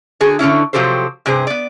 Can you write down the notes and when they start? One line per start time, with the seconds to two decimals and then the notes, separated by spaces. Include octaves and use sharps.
0.21 D3 F#4 G#4
0.39 D3 B3 C#4 E4
0.73 C3 F3 F#3 G4 A4 C5
1.26 G2 C3 G#4 C5
1.47 B3 D5